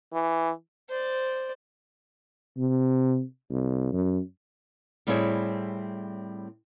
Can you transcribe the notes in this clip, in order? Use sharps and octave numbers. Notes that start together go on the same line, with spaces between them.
E3
C5 D5
C3
C2
F#2
A2 G3 C4 E4 G#4 C#5